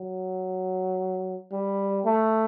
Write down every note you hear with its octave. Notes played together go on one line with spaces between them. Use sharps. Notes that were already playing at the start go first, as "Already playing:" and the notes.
Already playing: F#3
G3
A3